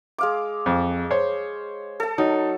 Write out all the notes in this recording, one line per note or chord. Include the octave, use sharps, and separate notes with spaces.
G#3 F5 D6
F2
C5 C#5
A4 A5
F#3 D#4